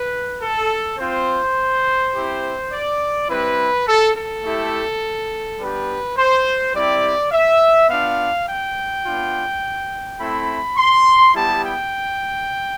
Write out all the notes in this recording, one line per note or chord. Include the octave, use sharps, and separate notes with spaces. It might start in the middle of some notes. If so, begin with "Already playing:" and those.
Already playing: B4
A4
C4 F4 C5
C4 E4 G4
D5
G3 C4 E4 B4
A4
A4
A3 E4 G4
G3 B3 D4 G4 B4
C5
G3 C4 E4 G4 D5
E5
B3 D4 F4 F5
G5
B3 D4 F4
A3 C4 E4 B5
C6
G3 B3 E4 G4 A5
G5